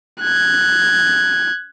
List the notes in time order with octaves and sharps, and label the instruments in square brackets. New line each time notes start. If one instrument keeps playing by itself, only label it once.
[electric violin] F#6 G#6